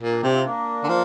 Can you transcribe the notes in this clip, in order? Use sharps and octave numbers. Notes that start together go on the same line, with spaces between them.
A#2
A#3 D4
C3 D4 G4
C4 F4
A#3 D4
D3
F3